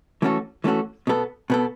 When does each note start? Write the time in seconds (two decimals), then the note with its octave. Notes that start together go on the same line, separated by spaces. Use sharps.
0.22 E3 A3 C#4 F#4 A4
0.64 E3 A3 C#4 F#4 A4
1.07 B2 B3 A4
1.50 B2 B3 A4